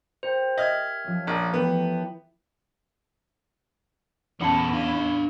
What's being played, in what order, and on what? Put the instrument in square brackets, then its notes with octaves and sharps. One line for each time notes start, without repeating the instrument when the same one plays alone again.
[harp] G4 A#4 [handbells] C5
[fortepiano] D#5 [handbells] E5 F6 G#6
[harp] F3 C#4
[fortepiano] A#1
[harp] E3 A3 G4 [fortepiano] B3
[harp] A#4
[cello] E2 E4 [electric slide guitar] A#2 F#3 F#5 [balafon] E3 C#4 A5
[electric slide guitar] D4 F5